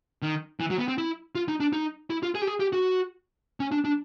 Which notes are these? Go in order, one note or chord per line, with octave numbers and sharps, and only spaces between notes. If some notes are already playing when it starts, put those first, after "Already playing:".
D#3
E3
F#3
B3
C4
E4
F4
D#4
D4
D#4
E4
F4
G#4
G4
G#4
G4
F#4
C#4
D4
D4